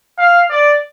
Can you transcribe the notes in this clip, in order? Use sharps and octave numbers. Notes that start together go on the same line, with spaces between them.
F5
D5